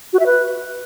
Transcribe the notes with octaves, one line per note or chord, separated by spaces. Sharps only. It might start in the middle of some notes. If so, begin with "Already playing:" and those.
F#4
E5
B4